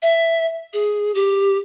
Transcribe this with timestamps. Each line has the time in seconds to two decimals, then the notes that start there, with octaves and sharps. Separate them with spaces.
0.02 E5
0.73 G#4
1.15 G4